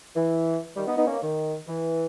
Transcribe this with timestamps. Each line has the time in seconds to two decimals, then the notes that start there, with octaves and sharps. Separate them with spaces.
0.16 E3
0.76 D#3 G3
0.87 B3 D#4
0.97 B3 D#4
1.06 A#3 C#4
1.22 D#3
1.68 E3